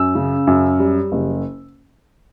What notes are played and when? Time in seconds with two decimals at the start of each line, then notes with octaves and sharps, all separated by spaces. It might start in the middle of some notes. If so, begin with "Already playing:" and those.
Already playing: F#2 E6
0.15 C#3
0.47 F#2
0.80 G3
1.12 F#1